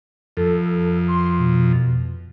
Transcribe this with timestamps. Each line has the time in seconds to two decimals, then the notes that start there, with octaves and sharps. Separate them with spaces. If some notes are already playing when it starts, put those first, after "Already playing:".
0.37 F2 A4
1.08 C6
1.38 B2